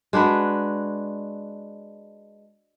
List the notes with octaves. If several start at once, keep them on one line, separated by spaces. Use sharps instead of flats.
G#3 D4 F#4 B4